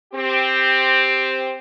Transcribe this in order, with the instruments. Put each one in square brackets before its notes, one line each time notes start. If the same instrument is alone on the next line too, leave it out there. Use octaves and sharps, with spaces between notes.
[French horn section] C4 G4